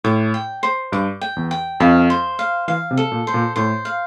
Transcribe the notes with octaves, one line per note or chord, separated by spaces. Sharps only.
A2 D6
G5
C5
G2 D6
G5
E2
G5
F2 F5
C5
F5
E3 F5
C3
A4
A#2
C5
A#2
A2 C5
F5